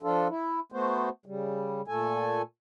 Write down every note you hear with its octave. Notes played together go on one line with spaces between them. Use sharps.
F3 D4 F4 A4
E4
A3 B3 F#4 C5
C#3 G3
A#2 A3 A4 G#5